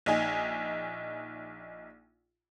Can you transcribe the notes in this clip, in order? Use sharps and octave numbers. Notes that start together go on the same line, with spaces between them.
A#1 D#4 G#5